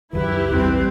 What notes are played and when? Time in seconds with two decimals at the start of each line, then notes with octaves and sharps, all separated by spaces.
0.13 C#2 F#2 D#3 E4 G4 B4
0.51 A#1 E2 G3 C4